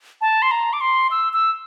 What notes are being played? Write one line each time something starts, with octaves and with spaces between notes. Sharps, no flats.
A5
C6
A#5
D6
C6
E6
E6